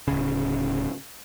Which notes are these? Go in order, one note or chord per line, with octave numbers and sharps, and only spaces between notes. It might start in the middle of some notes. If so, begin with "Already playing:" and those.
D1 C#3